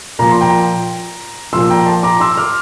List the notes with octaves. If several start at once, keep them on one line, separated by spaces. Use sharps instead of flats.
A#2 F3 A#5
C6
G5 A#5
A#2 F3 C6 E6
G5 A#5
A5 C6
A#5 D6
C6 E6
D6 F6